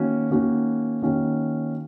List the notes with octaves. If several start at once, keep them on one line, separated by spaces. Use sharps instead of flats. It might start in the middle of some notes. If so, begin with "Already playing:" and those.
Already playing: D#3 A#3 C#4 F#4
D#3 A#3 C#4 F#4
D#3 A#3 C#4 F#4